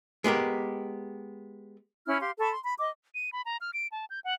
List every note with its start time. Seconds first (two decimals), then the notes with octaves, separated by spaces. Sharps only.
0.24 G#3 B3 G4 A#4
2.07 C#4 E4 B5 F6
2.20 G4 F5 C6
2.39 A4 A5 B5 C#6
2.51 C6
2.63 B5
2.78 D#5 D6
3.15 D#7
3.33 B5
3.46 A#5
3.61 F6
3.74 D7
3.92 A5
4.10 G6
4.24 F#5